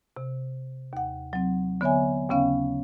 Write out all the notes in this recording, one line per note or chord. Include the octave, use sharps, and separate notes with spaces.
C3
D#2 F#5
F#3 C4
D3 B3 C#5 E5 G#5
D#2 C#3 B3 C#4 F5